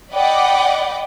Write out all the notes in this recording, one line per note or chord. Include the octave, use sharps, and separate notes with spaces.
D5 D#5 F#5 G5 B5 D6